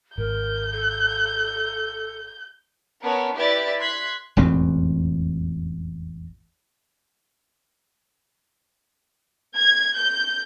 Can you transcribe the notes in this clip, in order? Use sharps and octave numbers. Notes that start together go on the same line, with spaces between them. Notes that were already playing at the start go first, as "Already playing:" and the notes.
G#1 A#4 G6
A4
B3 C#4 A#4 C#5 A5
E4 G4 B4 D5 E5 A6
C6 F#6 G#6 B6
E1 A1 F2 C4
G#6
G6